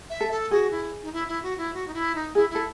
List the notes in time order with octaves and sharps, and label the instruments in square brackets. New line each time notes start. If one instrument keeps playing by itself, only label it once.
[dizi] E5
[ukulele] A4
[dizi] A4
[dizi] F#4 [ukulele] G#4
[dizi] E4
D#4
E4
E4
F#4
E4
F#4
D#4
E4
D#4
[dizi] E4 [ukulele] G#4
[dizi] E4
[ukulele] A4